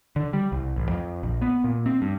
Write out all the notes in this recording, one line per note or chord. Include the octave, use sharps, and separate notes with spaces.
D3
G3
C2
A1
F2
A#1
B3
A#2
C4
G2